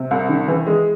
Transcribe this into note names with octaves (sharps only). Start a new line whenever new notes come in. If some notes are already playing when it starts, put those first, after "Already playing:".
Already playing: C3
C2
D#3
E3
G#3